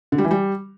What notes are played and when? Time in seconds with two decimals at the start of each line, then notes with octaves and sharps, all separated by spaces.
0.12 D3
0.18 G3
0.25 E3
0.31 G3